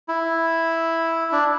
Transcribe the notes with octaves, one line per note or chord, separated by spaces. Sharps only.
E4
D4